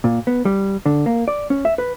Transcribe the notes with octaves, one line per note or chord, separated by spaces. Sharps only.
A#2
B3
G3
D3
A#3
D5
C#4
E5
B4